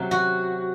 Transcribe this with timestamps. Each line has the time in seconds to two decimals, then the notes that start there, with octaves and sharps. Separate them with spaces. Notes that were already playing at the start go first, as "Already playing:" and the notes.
Already playing: C3 F#3
0.11 F#4